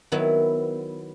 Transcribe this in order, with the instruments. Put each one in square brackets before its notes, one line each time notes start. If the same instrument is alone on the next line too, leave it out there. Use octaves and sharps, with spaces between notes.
[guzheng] D#3 F#3 B3 E4